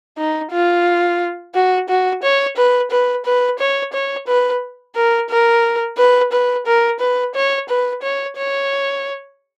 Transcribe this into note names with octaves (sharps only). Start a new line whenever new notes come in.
D#4
F4
F#4
F#4
C#5
B4
B4
B4
C#5
C#5
B4
A#4
A#4
B4
B4
A#4
B4
C#5
B4
C#5
C#5